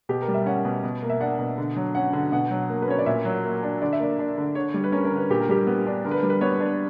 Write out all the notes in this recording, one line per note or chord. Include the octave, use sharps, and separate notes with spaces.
B2 G4
A#4
G3
E5
C#4 F#5
B2
B2
A#3
E5
D4 F#5
B2
D3
F#3
C#4 F#5
D3
B2 F#5
F#3
A#3
B4
C#4 C#5
D5
A#2 E5
F#3
A#3
D4
D3 D5
E5
A#3 D5
D4
D3
D3 C#5
G3
B4
C#4 A#4
A#4
D3
B4
A#2 G4
A#4
G3 G4
B3
D4
D3 A#4
B4
A#4
G3
B4
B3 C#5
D4